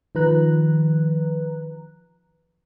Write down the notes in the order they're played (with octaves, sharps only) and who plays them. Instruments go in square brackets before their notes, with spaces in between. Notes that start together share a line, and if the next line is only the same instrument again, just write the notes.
[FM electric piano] D#3 F3 B4 A#5 F#6